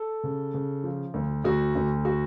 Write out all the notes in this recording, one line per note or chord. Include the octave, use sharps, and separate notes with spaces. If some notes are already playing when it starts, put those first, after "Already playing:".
Already playing: A4
C#3
C#3
F3
D2
D2 F#4
D2
F#4